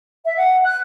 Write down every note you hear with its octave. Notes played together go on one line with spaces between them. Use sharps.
E5
F#5
F#6